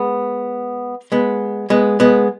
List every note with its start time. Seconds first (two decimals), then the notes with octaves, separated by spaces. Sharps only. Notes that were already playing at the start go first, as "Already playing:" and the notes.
Already playing: G#3 B3
1.12 G#3 B3
1.70 G#3 B3
2.00 G#3 B3